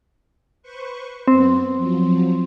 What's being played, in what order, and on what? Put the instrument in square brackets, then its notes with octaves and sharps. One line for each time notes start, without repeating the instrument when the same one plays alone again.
[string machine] B4 C5 C#6
[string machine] F#2 B3 [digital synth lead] C4
[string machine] F3 F#3